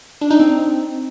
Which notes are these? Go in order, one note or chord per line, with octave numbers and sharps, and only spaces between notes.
D4
D#4
C4